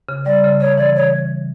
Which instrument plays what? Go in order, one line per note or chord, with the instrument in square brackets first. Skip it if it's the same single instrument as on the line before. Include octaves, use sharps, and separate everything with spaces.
[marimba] C#3
[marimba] G3 [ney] D5
[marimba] C#3
[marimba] C#3 [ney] C#5
[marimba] E3 [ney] D5
[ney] C#5